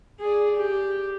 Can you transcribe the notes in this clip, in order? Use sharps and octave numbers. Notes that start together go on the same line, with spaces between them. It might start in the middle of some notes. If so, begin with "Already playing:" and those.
G#4 D5
G4